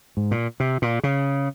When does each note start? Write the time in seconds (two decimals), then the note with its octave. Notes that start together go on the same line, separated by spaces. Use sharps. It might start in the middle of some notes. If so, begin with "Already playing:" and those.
0.17 G#2
0.31 A#2
0.60 C3
0.82 A#2
1.03 C#3